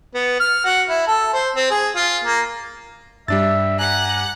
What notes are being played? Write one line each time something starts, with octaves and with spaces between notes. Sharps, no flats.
B3
F6
F#4
E4
A4
C5
C4
G#4
F4
A#3
G2 G3 D4 E5 A6
G4 F#5 G#5 A#5 F#6